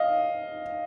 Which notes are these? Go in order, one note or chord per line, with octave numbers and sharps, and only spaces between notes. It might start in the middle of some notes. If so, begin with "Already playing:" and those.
Already playing: D#5 F5